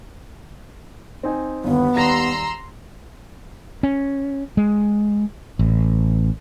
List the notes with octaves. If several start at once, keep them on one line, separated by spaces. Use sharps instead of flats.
C4 D#4 G#5
G1 D#2 B3
D#2 G3 A#5 C6 E6 A#6
C#4
G#3
A1